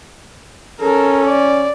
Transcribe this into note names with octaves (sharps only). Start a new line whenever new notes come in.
C#4 A4 A#4
D5